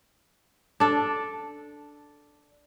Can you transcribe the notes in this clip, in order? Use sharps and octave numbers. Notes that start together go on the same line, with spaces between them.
D4 A4